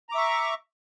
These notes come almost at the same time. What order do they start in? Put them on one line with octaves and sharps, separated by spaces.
A#5 D6 E5 C#6